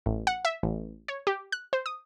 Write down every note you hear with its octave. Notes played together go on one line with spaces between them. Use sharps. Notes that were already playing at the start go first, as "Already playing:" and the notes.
A1
F#5
E5
A1
C#5
G4
F#6
C5
D#6